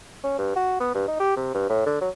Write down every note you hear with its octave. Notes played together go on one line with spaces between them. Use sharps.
C#4
G2
F#4
B3
G2
D#4
G4
C3
G2
A2
D3
F#3